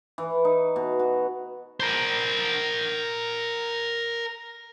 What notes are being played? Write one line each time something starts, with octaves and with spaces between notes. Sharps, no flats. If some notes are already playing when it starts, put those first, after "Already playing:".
E3
D#4
B2
F#4
A#4 C5